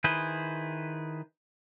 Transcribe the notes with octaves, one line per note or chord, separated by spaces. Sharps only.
D#3 E4 G#4 B4 C5